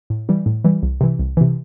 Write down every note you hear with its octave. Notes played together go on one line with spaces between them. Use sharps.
A2
E3 G3
A2
E3 G3
C2
C3 E3
C2
C3 E3